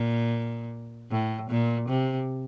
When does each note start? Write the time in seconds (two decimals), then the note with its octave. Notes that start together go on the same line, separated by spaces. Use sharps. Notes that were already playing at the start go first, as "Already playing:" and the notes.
Already playing: A#2
1.12 A2
1.50 A#2
1.89 C3